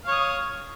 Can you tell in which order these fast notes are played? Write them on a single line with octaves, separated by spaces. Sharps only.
F5 C#5 D#6